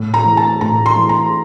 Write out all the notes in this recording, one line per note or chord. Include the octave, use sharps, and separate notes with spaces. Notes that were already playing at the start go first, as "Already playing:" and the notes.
Already playing: A2
A#5
E3
A5
A2 A#5
C6
E3
A#5